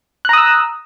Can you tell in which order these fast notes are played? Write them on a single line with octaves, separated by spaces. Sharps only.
F#6 A#5 D#6 E6